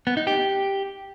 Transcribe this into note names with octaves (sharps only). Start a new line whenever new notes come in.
B3
D#4
G4